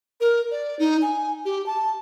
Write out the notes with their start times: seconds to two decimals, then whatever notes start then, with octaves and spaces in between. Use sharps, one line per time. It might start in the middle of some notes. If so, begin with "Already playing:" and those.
0.20 A#4
0.51 D5
0.79 D#4
1.02 G#5
1.45 G4
1.66 A5